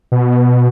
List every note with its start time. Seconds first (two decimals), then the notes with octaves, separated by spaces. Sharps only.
0.12 B2